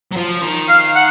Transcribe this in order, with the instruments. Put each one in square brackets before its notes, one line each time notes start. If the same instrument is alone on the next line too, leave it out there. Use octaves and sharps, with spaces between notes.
[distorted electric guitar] F#3
F3
D#3
[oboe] F5
F#5